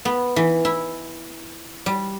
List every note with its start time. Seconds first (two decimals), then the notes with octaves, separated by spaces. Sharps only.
0.05 B3
0.36 E3
0.65 E4
1.86 G3